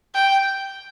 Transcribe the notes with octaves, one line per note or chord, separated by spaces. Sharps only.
G5